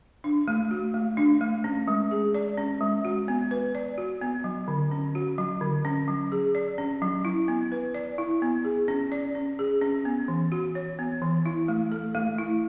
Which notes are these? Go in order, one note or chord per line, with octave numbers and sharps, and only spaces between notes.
D4
A3
F#4
A3
D4
A3
C#4
G#3
G#4
D5
C#4
G#3
F#4
B3
B4
D5
F#4
B3
F#3
D3
C#4
F#4
F#3
D3
C#4
F#3
G#4
D5
C#4
F#3
E4
B3
B4
D5
E4
B3
G#4
C#4
D5
C#4
G#4
C#4
B3
E3
F#4
C#5
B3
E3
E4
A3
A4
A3
E4